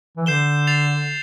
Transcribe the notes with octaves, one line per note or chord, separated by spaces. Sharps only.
E3
D3 G6 C7 E7 G7
A6 C7 F7